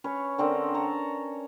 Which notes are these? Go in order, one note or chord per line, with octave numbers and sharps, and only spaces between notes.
C#4 B4 C#5
D3 C4 C#4 A#4
C#5 A5 A#5